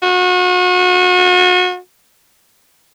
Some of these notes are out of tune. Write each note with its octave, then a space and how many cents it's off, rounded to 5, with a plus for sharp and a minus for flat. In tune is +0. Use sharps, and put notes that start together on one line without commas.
F#4 -35